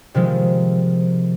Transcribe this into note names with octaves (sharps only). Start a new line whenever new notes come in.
C3 D#3 F3 G#3